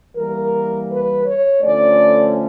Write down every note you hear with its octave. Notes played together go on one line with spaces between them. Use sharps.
E3 G3 A#3 A#4
B4
C#5
D3 F3 A3 C#4 D5